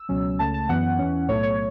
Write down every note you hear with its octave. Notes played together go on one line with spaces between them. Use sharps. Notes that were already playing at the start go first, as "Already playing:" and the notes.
Already playing: E6
C#2 B2 F#3 C#4
C#2 C#3 A3 C#4 A5
A5
F#2 E3 B3 F#5
E2 E3 C#4
B1 A2 A3 C#5
C#5